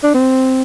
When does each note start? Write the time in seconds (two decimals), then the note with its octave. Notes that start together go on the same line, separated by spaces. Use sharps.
0.03 D4
0.14 C4